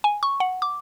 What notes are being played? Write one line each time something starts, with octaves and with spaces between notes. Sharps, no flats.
G#5
C#6
F#5
D6